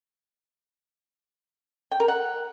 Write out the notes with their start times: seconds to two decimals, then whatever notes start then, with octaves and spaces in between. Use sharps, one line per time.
1.91 G5
2.00 A#4
2.08 F#5